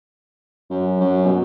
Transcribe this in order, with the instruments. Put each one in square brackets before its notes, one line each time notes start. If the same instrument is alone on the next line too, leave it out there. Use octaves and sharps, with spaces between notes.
[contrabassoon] F#2
F#2
B2